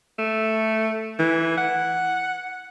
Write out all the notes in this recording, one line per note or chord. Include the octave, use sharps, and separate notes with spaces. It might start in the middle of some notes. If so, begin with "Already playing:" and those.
A3
E3
F#5